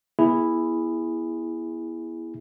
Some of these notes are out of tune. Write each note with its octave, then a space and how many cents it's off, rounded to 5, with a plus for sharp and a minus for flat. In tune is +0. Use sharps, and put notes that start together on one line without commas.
B3 -25 E4 +0 G#4 -15